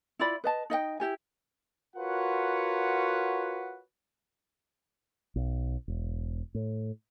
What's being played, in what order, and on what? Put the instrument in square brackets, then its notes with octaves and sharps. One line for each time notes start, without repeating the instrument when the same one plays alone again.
[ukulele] E4 F4 D5 B5
B4 D#5 A5
D#4 D#5 E5 G5
E4 G4 G#5
[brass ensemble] F4 F#4 A#4 B4 C#5 F#5
[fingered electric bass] B1
E1
A2